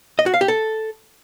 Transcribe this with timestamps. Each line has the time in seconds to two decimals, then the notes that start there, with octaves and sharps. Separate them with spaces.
0.19 D#5
0.26 F#4
0.34 F5
0.41 G4
0.48 A4